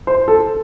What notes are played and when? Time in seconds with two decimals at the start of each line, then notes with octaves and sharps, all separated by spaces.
0.07 C5
0.28 A4